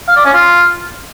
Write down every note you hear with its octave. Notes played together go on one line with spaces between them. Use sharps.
F5
D5
C#4
F4